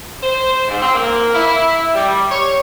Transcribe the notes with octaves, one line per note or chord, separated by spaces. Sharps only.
C5
G#2
C4
A#3
E4
G3
C#5